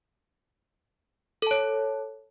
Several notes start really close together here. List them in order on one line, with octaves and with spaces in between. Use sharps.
A4 A5 C#5